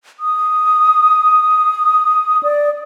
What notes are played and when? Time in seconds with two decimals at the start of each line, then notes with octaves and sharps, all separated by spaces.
0.20 D#6
2.43 D5